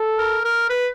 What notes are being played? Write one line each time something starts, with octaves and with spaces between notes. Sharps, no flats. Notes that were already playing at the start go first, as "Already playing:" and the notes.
Already playing: A4
A#4
A#4
B4